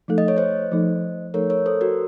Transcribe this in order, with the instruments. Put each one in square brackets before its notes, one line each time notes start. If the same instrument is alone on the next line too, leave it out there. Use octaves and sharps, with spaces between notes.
[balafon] F3 A3 D#4 A4
[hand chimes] D#5
C#5
C5 D#5
[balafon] F3 A3 D#4 A4
[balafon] F3 A3 D#4 A4 [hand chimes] A#4 C#5
[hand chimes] A#4 C#5
A4 C5
F#4 A#4